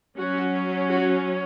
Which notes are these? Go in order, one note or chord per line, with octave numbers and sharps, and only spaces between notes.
F#3 C#4 F#4
F#4